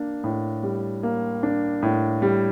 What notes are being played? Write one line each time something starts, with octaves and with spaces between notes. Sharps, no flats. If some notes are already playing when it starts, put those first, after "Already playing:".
Already playing: A#3 D4
A2
G3
A#3
D4
A2
G3